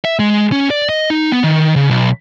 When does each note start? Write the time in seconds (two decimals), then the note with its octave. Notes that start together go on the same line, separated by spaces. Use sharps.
0.05 E5
0.19 G#3
0.52 C#4
0.71 D5
0.89 D#5
1.10 D#4
1.32 B3
1.44 D#3
1.76 C#3
1.90 B1